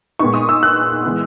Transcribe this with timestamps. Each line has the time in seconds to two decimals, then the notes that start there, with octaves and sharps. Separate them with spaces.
0.19 A#2 G#3 B3 D#4 C#6
0.34 D#6
0.49 E6
0.63 F#6
1.04 E3 G#3 B3 E4